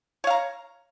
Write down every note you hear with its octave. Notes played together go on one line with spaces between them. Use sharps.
C#5 F5 A#5